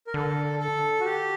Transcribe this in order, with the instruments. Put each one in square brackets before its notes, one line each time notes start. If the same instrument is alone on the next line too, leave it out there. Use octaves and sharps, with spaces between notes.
[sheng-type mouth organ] A#4
[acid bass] D3 [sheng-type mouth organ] A4
[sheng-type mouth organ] A4
F#4
G4